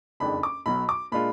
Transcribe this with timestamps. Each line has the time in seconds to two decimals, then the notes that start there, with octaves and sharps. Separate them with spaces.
0.20 F#1 F2 D#3 G#3 D4 B5
0.43 D6
0.66 B1 B2 F#3 B5
0.89 D6
1.12 A#2 G#3 D4 F4 B5